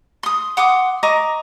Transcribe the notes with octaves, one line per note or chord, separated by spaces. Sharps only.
C6 D#6
F#5 C6 D6 D#6
D#5 A#5 C#6 D6